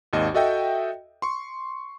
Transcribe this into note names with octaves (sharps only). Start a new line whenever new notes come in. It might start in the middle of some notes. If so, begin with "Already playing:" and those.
G#1 D#2 D#5
F#4 A4 D#5 E5 G5
C6 C#6